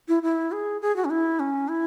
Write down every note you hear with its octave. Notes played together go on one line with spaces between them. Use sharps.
E4
E4
G#4
G#4
F#4
C#4
E4
C#4
E4